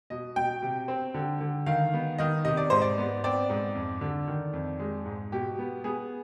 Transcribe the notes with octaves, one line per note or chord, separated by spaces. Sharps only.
B2 D#5
B2 G5
C3
C4
D3
D3
D#3 F5
B3
D#3 D#5
C3 D#5
D5
G#2 C5
D5
B3
C4 D5
G#2
F2
D3
D#3
F2
G#3
G#2
B2 G4
B3
B3 G#4